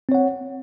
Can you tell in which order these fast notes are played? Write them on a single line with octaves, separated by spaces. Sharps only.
C4 C#5 F#5